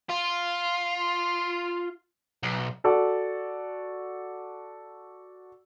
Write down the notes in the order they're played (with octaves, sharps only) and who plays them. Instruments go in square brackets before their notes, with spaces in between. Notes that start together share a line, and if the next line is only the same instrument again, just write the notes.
[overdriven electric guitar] F4
B1
[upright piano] F#4 A4 D5